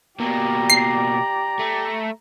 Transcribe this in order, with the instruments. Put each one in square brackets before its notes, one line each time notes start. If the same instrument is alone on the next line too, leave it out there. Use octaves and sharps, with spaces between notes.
[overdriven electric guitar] B2 A#3 [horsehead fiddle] G4 D5 [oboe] A#5
[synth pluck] C7
[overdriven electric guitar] A3